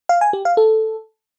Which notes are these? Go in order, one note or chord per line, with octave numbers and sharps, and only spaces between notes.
F5
G#5
G4
F5
A4